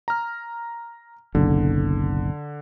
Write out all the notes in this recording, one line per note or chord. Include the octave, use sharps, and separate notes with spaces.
A#5 F6
F#1 B1 D3